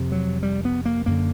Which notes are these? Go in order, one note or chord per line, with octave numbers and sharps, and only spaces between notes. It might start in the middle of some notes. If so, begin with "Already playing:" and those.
Already playing: F2 C3
F#3
G3
B3
A#3
F#2 D3 A#3